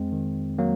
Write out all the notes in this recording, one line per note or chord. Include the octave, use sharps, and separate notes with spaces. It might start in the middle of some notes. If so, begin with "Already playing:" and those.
Already playing: F2 G#3 C4
D#3
F#3 A#3